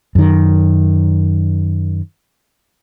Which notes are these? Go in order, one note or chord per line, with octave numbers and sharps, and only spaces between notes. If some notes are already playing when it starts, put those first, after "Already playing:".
F#2 D#3